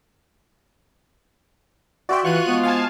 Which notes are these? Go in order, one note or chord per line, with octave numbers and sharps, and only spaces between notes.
F#4 D5 E5 F#5 G5 C6
E3 F4 C#6 F#6 D#7
F3 G#3 B3
F5 G#5 A5